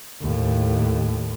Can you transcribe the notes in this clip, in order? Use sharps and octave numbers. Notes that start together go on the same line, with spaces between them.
D#2 A2